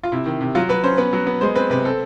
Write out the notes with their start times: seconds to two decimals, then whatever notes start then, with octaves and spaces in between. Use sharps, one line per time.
0.03 F4
0.12 C3 E4
0.26 D#3
0.41 C3
0.55 F#3 F4
0.69 F#3 B4
0.84 C#4 C5
0.98 B3 B4
1.13 F#3
1.27 B3
1.41 G#3 C5
1.55 C4 B4
1.70 C3 B4
1.84 C4 A4